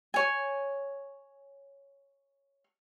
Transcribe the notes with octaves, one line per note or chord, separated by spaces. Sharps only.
C#5 G#5